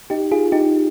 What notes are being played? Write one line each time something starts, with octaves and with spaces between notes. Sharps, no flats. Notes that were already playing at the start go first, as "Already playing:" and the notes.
D#4 G4
F4 G#4
D#4 G4